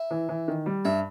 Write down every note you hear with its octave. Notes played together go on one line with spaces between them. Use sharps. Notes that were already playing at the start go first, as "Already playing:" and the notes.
Already playing: E4
E3
E3
D#3
G3
G2 E4